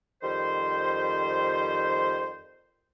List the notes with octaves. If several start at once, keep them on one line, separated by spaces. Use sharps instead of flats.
F2 D#3 G3 C5